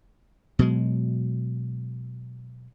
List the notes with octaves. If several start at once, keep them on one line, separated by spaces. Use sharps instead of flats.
B2 F#3 G#3